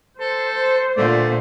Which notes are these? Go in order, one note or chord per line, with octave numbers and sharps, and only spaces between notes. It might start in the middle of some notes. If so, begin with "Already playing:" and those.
A4 C5
A#2 D3 A3 D5